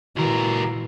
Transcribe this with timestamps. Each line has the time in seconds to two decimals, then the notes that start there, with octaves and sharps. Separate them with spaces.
0.16 C#2 A#2 E3 F#4 A#4